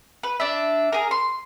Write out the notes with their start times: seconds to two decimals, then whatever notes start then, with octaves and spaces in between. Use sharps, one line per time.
0.23 B4
0.40 D4 E5
0.92 G#4 A#4
1.11 C6